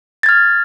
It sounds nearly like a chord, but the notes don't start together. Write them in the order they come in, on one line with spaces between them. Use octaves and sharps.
A6 G#6 F6